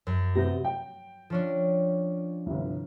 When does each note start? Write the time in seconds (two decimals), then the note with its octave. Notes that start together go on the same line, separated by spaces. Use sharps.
0.07 F#2
0.35 C3 F#3 B3 G6 A#6
0.64 G5
1.30 F3 C#4 D4
2.46 G1 C2